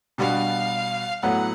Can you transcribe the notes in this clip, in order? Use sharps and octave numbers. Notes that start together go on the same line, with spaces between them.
B2 G3 B3 D4 F#4 F5
A2 F#3 B3 F#5